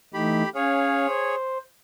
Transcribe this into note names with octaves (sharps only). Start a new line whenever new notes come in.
E3 A3 D#4 G4 B5
C#4 G#4 C#5 F5
C5